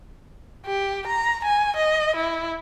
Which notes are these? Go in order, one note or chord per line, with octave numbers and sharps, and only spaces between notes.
G4
A#5
G#5
D#5
E4